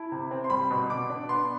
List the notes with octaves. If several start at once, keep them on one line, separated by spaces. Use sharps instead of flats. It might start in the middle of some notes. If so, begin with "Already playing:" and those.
Already playing: E4 A5
C3
C4
C6
G3 B5
B2
B2 D6
D4
B3 C6